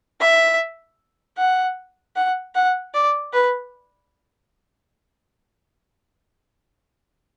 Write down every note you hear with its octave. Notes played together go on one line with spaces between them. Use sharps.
E5
F#5
F#5
F#5
D5
B4